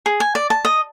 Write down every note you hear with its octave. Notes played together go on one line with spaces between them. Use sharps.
G#4
G#5
D5
A5
D#5